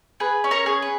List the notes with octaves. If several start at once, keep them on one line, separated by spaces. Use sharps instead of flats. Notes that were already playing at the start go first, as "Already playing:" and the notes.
G#4 B4
C#4
A#4 C#5
G#4
B4